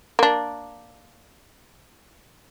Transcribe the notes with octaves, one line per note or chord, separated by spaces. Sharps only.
A#3 D4